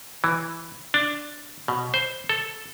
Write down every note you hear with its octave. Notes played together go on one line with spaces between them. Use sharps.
E3
D4
B2
C5
A4